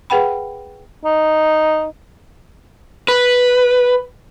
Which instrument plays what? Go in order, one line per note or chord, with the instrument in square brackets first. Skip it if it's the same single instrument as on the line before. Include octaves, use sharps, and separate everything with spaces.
[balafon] G#4 B4 F#5 G5 B5
[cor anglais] D#4
[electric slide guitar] B4